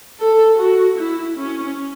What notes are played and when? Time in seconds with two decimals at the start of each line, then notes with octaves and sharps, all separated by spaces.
0.20 A4
0.59 F#4
0.98 E4
1.37 C#4